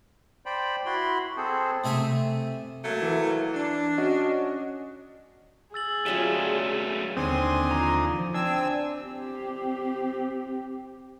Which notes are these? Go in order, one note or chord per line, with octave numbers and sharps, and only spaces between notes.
C5 D5 G5 B5
E4 F#4 B5 C6
C4 G#4 A4 C5
C3 A3 E5 G#5
F#3 A3 A#3
E3
D4
C#4 F#4 D#5
G#4 E6 A6 F#7
F#3 G3 A3 C#4 F4 B6 E7 G7
D#2 D3 C4 G#5 C6 D#6
F3 A#5
C4 D4 G#5 E6
C4 G4